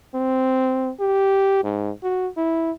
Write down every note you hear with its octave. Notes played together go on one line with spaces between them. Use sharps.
C4
G4
G#2
F#4
E4